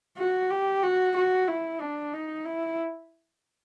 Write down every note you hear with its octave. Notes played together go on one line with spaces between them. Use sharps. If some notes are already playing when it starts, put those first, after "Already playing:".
F#4
G4
F#4
F#4
E4
D4
D#4
E4